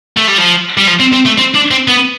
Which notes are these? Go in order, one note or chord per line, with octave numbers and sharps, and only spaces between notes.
A3
G3
F3
G3
F3
C4
C4
A3
C4
D4
C4
B3